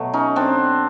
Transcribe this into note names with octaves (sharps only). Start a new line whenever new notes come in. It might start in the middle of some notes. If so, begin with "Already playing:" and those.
Already playing: B2 F#3 A3
C#4 D#4
C4 D4